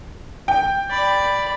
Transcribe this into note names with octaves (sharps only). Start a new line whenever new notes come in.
G5
D5 B5